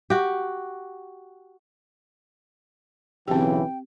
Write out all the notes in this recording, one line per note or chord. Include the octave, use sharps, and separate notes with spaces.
F#4 G4
B1 C#3 E3 C4 G4 G5